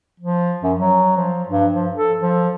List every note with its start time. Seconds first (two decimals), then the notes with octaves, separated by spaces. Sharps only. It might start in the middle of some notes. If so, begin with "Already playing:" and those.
0.20 F3
0.63 F#2
0.79 F#3
1.17 F3
1.49 G2
1.74 F3
1.96 A4
2.20 F3